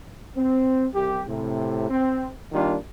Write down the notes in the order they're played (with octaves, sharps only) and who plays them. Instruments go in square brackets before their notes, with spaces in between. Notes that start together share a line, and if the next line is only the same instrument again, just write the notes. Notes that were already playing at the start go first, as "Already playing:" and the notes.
[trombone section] C4
C2 G4
A2 C3
C4
D#3 G3 A#3 D4 F4